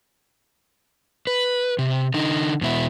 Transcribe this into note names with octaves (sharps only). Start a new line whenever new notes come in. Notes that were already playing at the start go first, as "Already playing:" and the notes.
B4
C3
D3 D#4
E2 B2 E4